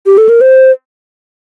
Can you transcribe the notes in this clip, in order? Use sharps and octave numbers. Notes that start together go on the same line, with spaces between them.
G4
A4
A#4
C5